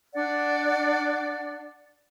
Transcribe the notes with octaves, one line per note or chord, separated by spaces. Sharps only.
D4 D5 F#5